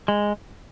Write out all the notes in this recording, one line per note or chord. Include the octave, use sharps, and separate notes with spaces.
G#3